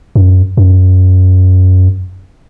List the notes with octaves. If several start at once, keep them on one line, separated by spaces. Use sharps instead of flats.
F#2
F#2